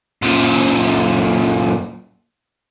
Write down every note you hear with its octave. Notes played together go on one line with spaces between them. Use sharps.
F#2 A#2